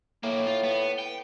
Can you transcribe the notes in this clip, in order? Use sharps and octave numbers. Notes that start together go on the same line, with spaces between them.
B1 A2 A#3
F4
B3
G5